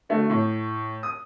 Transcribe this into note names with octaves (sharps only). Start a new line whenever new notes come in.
D3 A3 F#4
A2
D#6